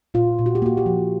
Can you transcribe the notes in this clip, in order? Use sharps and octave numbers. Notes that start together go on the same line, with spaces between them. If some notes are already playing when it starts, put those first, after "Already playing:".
A#2 F4
A#2
F#4
G4
A#3 F#4
G4
F3